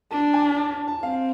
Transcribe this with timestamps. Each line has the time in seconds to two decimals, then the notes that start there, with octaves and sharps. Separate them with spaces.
0.11 D4 A5
0.34 G#5
0.57 A5
0.88 A5
1.03 C4 F5